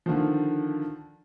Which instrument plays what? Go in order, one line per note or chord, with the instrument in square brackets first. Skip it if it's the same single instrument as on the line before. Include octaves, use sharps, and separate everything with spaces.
[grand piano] D3 D#3 F3